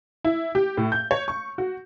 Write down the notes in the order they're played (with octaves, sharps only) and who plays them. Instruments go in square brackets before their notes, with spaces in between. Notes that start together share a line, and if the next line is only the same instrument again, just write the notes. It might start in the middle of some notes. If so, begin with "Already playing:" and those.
[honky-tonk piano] E4
G4
A2
G6
C#5
C#6
F#4